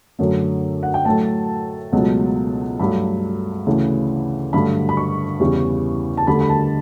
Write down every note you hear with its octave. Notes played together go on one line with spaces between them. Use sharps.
F#2 D3 F#3 A3
F#5
G5
A2 F#3 A3 A5
C#2 B2 F#3 A3
G2 F#3 A3 B5
D2 C#3 E3
G2 D3 F#3 A3 B5
B5
C#6
E2 C#3 E3 G3
A5
D2 D3 G3 B5
B5
A5